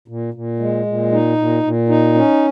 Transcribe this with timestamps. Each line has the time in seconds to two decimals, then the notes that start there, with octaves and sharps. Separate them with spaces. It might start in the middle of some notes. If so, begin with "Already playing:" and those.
0.08 A#2
0.34 A#2
0.59 G#3
0.86 A#2
1.12 D#4
1.37 A#2
1.63 A#2
1.89 D#4
2.14 C#4